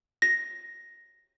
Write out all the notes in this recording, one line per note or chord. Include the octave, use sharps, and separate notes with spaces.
A#6